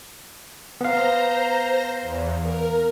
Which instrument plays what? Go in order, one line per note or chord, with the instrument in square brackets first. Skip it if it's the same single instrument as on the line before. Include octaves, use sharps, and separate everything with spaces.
[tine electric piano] B3 F5 [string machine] C5 A#5 A#6
[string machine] E2
A#4